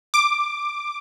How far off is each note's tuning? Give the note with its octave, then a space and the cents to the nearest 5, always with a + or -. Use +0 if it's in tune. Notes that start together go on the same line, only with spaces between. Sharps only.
D6 +10